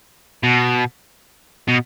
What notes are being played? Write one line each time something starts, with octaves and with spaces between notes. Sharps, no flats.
B2
B2